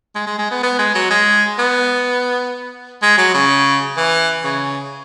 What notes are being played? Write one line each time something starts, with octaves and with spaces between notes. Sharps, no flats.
G#3
G#3
G#3
B3
B3
G#3
F#3
G#3
B3
G#3
F#3
C#3
E3
C#3